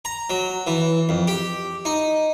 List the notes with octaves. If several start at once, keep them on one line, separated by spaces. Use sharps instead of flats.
A#5
F#3
E3
F2
G4
D#4